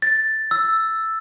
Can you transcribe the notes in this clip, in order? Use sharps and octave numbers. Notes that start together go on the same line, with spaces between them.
A6
E6